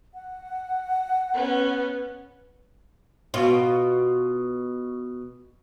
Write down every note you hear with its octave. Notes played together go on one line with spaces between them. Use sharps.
F#5
B3 C#4
B2 F4